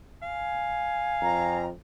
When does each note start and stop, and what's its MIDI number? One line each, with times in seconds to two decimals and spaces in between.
0.22 1.62 77
0.22 1.63 80
1.22 1.70 41
1.22 1.66 82